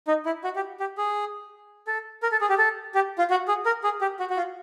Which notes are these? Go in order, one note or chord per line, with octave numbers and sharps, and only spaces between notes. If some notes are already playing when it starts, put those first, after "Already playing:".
D#4
E4
F#4
G4
G4
G#4
A4
A#4
A4
G#4
G4
A4
G4
F4
F#4
G#4
A#4
G#4
G4
F#4
F#4
F4